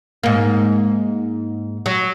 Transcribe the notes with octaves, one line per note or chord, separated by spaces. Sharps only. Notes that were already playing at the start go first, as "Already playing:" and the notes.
G#2 A#3
F#3